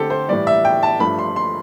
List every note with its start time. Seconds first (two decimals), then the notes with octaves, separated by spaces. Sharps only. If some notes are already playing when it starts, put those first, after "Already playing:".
Already playing: D3 A3 C4 G4 A4
0.10 C5
0.29 A2 E3 G3 D5
0.47 E5
0.65 G5
0.83 A5
1.00 G2 F3 A3 D4 B5
1.19 C6
1.36 C6